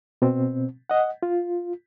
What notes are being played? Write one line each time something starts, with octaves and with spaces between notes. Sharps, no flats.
B2 C4
D#5 F#5
F4